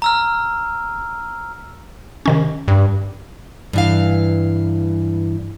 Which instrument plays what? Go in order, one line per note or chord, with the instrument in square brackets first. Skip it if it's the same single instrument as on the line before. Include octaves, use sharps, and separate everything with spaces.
[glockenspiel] A#5 E6 F6
[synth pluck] C3 D#3 C#4
[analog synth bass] G2
[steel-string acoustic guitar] G2 E3 F5